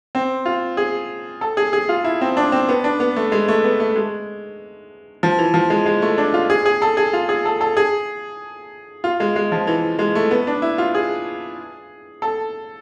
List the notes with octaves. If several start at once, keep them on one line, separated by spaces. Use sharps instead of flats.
C4
F4
G#4
A4
G#4
G#4
F4
E4
C4
D4
C4
B3
D4
B3
A3
G#3
A3
B3
A3
G#3
F3
E3
F3
G#3
G#3
A3
D4
F4
G#4
G#4
A4
G#4
F4
G#4
A4
A4
G#4
F4
G#3
G#3
F3
E3
G#3
A3
B3
D4
E4
F4
G#4
A4